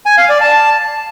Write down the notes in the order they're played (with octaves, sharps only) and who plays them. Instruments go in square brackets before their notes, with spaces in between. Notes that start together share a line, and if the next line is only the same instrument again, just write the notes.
[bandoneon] G#5
F5
D5
A5